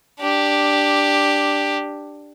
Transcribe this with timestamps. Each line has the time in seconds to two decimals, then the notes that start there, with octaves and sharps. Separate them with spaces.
0.20 D4 G4